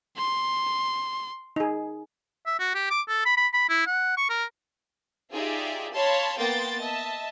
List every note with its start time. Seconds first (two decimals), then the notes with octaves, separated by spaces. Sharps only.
0.17 C6
1.56 D#4 G#4
2.46 E5
2.59 F#4
2.75 G4
2.90 D6
3.08 A4
3.26 B5
3.37 B5
3.54 B5
3.69 E4
3.87 F#5
4.17 C#6
4.30 A#4
5.33 D#4 F4 G4 G#4 D5 E5
5.93 C#5 F5 A5 B5 C6
6.38 A#3 B3 G5 C6 A6
6.82 D#5 E5 A5